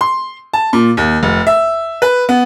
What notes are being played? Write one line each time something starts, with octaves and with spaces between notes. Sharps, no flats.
C6
A5
A#2
D#2
F1
E5
B4
B3